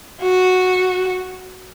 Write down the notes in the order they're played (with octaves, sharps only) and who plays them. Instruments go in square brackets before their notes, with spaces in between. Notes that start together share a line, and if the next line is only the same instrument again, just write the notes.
[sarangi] F#4